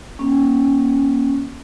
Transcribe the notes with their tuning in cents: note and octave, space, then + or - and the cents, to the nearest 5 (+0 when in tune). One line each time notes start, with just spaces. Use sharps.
A#3 +30 C#4 +0